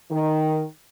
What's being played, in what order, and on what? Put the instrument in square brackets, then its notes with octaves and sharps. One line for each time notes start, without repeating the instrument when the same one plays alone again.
[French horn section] D#3